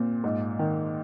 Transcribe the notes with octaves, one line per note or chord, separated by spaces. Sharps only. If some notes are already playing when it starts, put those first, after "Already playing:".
Already playing: A#2 C4
G#2
D#3